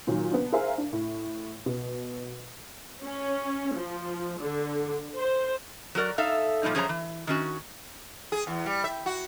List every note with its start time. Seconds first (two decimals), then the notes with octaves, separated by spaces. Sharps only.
0.07 A#2 D#3 F#3
0.32 B3 D4
0.52 G#4 A#4 C5 E5 F5 G#5
0.78 D4
0.93 A2
1.66 B2
3.02 C#4
3.74 F3
4.40 D3
5.16 C5
5.95 F#3 F#4 A#4 D5
6.18 D#4 A4 E5 F5
6.63 A#2 F3 G3 D#4
6.75 F#2 F3 G#4 C5 C#5 A#5
6.89 E3
7.27 D#3 C#4 F#4
8.32 G#4
8.47 E2
8.66 G3
8.84 E5
9.06 F#4